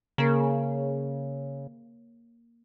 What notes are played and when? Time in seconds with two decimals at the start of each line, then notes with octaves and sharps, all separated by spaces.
0.18 C#3 A#3 A#4